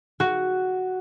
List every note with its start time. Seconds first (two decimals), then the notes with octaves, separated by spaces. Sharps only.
0.20 F#4